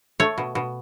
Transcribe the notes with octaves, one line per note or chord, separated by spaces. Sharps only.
A3 C#5
B2
B2